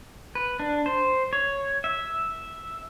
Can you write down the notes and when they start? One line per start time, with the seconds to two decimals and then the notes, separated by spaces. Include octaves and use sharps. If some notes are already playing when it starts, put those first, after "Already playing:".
0.35 B4
0.60 D4
0.86 C5
1.33 C#5
1.84 E5